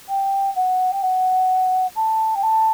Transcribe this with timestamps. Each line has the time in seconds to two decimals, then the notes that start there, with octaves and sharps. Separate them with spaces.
0.08 G5
0.55 F#5
0.91 G5
1.02 F#5
1.96 A5
2.35 G5
2.43 A5